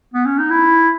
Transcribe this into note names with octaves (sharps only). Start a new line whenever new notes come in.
B3
C#4
D#4
E4